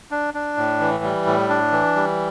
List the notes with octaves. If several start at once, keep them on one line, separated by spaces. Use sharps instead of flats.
D4
D4
A2
E3
G3
A2
D4
E3
G3